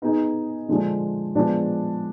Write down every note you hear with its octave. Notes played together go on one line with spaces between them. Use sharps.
B3 D#4 G#4 D#5
D3 F3 G#3 D4
F3 G#3 B3 D4 G#4